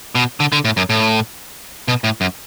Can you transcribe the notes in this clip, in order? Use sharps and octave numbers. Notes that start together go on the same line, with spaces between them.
B2
D3
D3
A2
F#2
A2
B2
A2
F#2